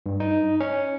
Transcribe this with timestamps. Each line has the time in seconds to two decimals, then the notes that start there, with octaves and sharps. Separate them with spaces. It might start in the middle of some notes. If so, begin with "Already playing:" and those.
0.06 G2
0.20 D#4
0.60 C#4